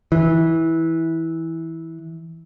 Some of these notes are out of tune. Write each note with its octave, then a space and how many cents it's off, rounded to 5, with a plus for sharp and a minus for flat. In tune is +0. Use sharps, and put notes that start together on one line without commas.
E3 -15